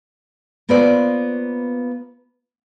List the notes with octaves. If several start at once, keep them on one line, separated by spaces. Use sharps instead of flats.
A#3 B3 F4 B4 C5 D5